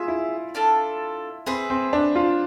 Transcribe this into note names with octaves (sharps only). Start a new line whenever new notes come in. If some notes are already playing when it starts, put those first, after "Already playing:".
Already playing: F4 G#4 E5 G#5
E4
D4 F4 A4
C4 G#4 B4 E5
C4
D4
F4